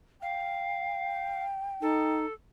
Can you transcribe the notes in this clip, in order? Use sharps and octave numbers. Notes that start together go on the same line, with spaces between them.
F5 G5
D#4 A4